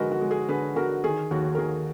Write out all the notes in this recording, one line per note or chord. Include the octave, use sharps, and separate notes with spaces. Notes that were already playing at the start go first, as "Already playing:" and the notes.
Already playing: D3 G#3 F#4 A#4 B4 D#5 F#5
F#4
G#3
G#4
D3 G#4 B4
D3 F#4 A#4
D#3 G#4
D#2 F#4
A#4
D#3 G#4